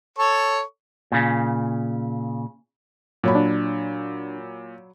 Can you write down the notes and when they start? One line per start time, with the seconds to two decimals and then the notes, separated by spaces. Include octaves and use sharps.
0.18 A4 C#5 C#6
1.12 A#2 C#3
3.24 A#2 F#3 C#5 B5
3.35 D4